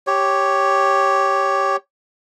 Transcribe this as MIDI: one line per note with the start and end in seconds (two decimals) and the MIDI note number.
0.07 1.77 67
0.07 1.77 73